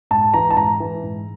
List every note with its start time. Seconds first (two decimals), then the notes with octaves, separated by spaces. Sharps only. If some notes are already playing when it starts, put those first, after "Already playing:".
0.11 G#2 A5
0.34 E3 A#5
0.51 A5
0.57 G#2 A#5
0.80 E3
1.03 G#2